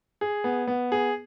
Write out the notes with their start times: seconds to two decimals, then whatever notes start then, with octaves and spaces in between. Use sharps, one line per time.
0.21 G#4
0.44 B3
0.67 B3
0.92 G#4